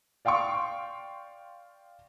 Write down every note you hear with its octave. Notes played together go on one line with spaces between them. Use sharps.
D5 F5 G5 C6 C#6